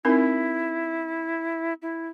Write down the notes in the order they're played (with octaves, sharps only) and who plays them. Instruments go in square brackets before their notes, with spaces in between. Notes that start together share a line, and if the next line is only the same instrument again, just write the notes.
[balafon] C4 D#4 A#4 [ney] E4
[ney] E4